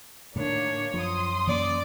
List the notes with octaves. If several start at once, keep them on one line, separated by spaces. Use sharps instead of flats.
A2 D3 D#3 A#3 D4 C#5
F#2 F3 C6 D#6
E3 A#3 C#4 D5